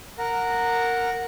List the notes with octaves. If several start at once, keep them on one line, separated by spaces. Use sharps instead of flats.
A#4 F#5 A#5